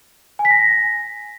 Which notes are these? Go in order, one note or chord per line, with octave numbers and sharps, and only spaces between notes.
G#5
B6
A#6